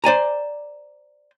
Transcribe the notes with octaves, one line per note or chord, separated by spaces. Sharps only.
C5 D5 G#5 A#5